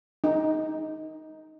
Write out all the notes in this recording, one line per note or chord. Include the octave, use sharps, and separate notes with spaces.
D#4